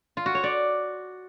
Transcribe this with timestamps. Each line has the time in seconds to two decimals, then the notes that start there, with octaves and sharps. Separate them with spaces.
0.17 F4
0.26 F#4
0.35 C#5
0.44 D5